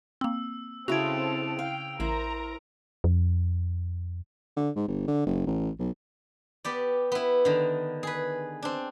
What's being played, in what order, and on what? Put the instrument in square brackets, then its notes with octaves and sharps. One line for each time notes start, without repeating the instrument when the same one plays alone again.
[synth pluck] A#3 C4 [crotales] E6
[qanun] C#3 E4 [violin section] C4 A4 [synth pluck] F#4 G#6 [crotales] D7 F7
[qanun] F5 [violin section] G5
[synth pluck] A1 [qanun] E4 C5 [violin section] A#4 A#5
[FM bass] F2
[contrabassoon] D3
G#2
G1
D3
F#1
A1
B1
[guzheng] B3 G4 D5
B3 E4
D3 D#3
G#4 B4
C4 D4